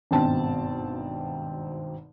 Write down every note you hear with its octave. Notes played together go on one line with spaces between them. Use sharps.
G#1 G2 B2 C4 A5